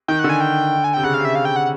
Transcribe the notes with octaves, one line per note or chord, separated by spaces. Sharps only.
D#3 G5
D3 F#5
G#5
G5
G#5
C3 G5
C#3 F#5
F5
C3
E5
F5
G5
F#5